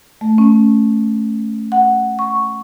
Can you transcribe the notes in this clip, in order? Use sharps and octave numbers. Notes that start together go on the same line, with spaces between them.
A3
C#4
F#5
C#6